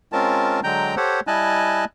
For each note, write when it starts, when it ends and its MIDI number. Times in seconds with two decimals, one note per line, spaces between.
0.13 0.60 56
0.13 0.60 60
0.13 0.60 61
0.13 0.60 65
0.13 0.60 70
0.13 0.60 81
0.64 0.95 50
0.64 0.95 54
0.64 0.95 56
0.64 0.95 79
0.64 0.95 82
0.64 0.95 91
0.97 1.20 67
0.97 1.20 69
0.97 1.20 72
0.97 1.20 73
0.97 1.20 78
1.27 1.85 55
1.27 1.85 64
1.27 1.85 75
1.27 1.85 80
1.27 1.85 81
1.27 1.85 90